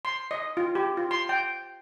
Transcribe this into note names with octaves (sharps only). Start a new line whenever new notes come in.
C6
D#5
F4
G4
F4
C6
G5